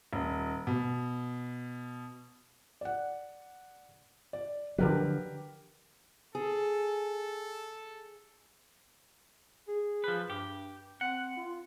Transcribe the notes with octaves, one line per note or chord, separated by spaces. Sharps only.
D#1
B2
D5 F#5
D5
D3 F3 F#3 G4 A#4 B4
G#4 A4
G#4
F3 B4
G2 G4
C4 F#5
F4